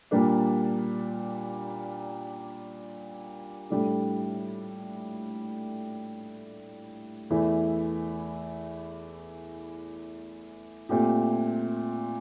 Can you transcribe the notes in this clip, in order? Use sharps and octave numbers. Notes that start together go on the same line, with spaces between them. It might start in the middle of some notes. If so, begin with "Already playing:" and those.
A#2 G3 A#3 D4
A2 G3 D4 A4
E2 E3 A3 E4
A#2 A3 C4 G4